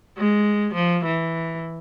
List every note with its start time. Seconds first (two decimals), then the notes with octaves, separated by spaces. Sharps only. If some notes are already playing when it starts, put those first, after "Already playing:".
0.18 G#3
0.75 F3
1.05 E3